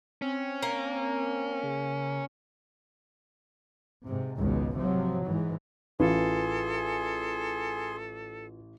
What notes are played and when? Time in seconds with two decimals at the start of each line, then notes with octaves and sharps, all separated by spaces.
0.22 C4 C#4
0.63 A#3
1.63 C#3
4.05 G#2 C3
4.37 G#1 C#2 G#2 B2
4.78 C3 F3 F#3
5.26 G#2 E3
6.00 A1 F4 G#4 A4 B4 G#5 C6